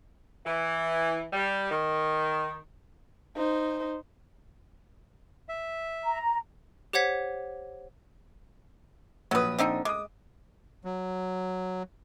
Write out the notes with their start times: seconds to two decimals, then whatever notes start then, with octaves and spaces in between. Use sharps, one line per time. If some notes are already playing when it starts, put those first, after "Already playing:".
0.45 E3
1.32 G3
1.70 D#3
3.37 D#4 C5
5.49 E5
6.05 A#5
6.93 G4 C5 C#5 F#5 G#6 B6
9.31 A#1 F#3 B4 D#6
9.59 D3 C4 D#4
9.85 G#3 D6 D#6
10.85 F#3